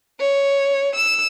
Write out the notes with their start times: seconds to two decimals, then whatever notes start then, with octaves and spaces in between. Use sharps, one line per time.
0.20 C#5
0.95 E6